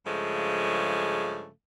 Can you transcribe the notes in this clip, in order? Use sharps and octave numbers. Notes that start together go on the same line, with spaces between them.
G2 C#3 F3 G#3 A3